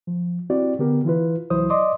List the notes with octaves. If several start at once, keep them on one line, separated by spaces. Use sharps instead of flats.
F3
C4 E4 F#4 G4 D5
D3 B3 G4 A#4
E3 E4 F4 B4
C2 E3 F#3 E4 C5 D#6
D5 D#5 C6 D6 D#6